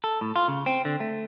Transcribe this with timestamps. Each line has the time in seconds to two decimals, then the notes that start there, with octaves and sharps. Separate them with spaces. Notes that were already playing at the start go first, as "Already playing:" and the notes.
0.04 A4
0.21 A2
0.36 F4
0.48 C#3
0.66 C4
0.85 D3
1.00 A3